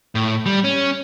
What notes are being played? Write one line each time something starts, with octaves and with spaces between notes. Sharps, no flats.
A2
G3
C#4